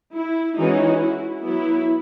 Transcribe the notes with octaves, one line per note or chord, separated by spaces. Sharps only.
E4
E3 G#3 C#4 D#4 F#4
E4
F#3 B3 E4